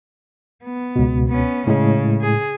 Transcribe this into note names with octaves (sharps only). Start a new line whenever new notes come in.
B3
C#2 B2
B3 C#4
A2 C#3 G#3
G#4